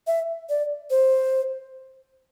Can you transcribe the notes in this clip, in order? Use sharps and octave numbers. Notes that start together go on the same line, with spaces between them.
E5
D5
C5